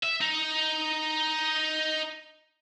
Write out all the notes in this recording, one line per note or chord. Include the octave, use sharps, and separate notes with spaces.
E5
D#4